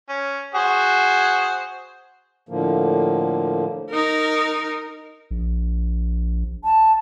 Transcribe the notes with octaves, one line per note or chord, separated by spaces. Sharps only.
C#4
F#4 G#4 C5
A2 D3 F3 A#3
D#4 A#4
A#1
A5